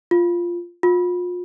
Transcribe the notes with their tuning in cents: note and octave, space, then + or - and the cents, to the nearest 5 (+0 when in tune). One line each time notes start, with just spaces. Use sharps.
F4 -5
F4 +35